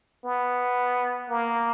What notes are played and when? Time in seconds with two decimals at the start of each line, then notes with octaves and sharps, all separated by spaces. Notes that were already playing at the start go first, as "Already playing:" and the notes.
0.24 B3
1.29 A#3